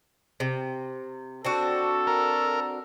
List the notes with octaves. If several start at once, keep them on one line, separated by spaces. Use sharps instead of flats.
C3
C4 D4 F#4 A4
A#4